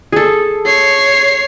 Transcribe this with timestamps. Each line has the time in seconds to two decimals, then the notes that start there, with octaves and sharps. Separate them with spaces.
0.12 G#4 A4
0.66 C#5 C7